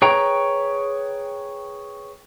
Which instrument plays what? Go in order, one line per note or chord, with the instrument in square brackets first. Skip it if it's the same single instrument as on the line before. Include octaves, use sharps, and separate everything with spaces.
[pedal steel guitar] G#4 B4 C#5 G5 A#5